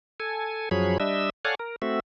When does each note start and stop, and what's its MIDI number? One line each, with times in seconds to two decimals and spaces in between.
0.20 0.69 69
0.20 0.69 80
0.71 0.98 42
0.71 0.98 53
0.71 0.98 54
0.71 0.98 68
0.71 0.98 73
0.71 0.98 83
1.00 1.30 55
1.00 1.30 62
1.00 1.30 75
1.00 1.30 76
1.00 1.30 88
1.45 1.55 69
1.45 1.55 73
1.45 1.55 74
1.45 1.55 77
1.45 1.55 78
1.45 1.55 80
1.59 1.76 70
1.82 2.00 57
1.82 2.00 60
1.82 2.00 66
1.82 2.00 76